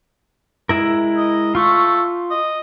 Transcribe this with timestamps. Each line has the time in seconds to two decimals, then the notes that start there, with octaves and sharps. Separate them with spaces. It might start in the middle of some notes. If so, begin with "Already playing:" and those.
0.69 G#3 E4 A#4
1.17 D#5
1.55 A3 F4 C#6
2.30 D#5